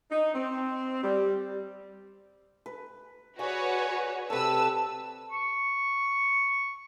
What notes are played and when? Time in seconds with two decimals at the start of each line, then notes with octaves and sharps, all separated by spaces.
0.12 D#4
0.35 C4
1.03 G3
2.66 B4
3.39 F#4 G#4 B4 C#5 D5 C#6
4.30 C3 A4 B4 E6
5.31 C#6